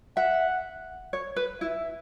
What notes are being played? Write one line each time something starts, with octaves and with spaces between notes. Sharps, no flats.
E5 F#5
C#5
B4
E4 E5